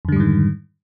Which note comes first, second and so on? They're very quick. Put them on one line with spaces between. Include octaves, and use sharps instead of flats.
F2 D3 G3 G#2 D#3